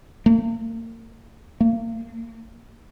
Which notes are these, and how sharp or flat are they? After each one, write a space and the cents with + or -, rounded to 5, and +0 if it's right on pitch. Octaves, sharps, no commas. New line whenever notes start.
A#3 -40
A#3 -35